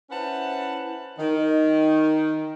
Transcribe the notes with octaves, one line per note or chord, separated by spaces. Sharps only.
C#4 E4 B4 C5 F#5 A5
D#3